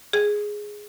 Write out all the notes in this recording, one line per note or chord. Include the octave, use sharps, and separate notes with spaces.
G#4